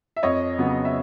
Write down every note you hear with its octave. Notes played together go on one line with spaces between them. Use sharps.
E5
F2 C#5 D#5
C#3 F#3 B3
E5